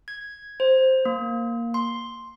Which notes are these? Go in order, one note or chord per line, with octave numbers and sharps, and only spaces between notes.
G#6
C5
A#3
C6